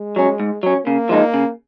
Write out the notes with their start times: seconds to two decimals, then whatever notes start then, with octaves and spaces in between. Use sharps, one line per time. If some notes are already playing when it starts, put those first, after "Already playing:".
Already playing: G#3
0.16 F#3 C#4
0.40 G#2
0.63 F#3 C#4
0.87 C#3 A#3
1.09 F3 G#3 D#4
1.34 C#3